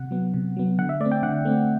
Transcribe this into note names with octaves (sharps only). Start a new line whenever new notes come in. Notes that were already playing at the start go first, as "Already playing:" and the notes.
Already playing: C3 F#5
F#3 B3
C3
F#3 B3
D3 F#5
E5
A3 C4 D5
G5
D3 F#5
A3 C4